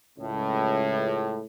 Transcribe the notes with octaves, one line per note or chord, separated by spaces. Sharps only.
C#2 A2